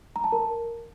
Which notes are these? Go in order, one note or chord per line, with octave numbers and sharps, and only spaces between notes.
A#5
A5
A#4